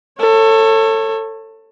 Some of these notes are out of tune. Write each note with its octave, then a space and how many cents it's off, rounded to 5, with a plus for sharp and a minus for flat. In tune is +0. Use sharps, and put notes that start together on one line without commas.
A4 +20 C#5 -15